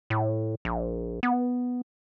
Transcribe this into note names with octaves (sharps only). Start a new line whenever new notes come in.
A2
A#1
B3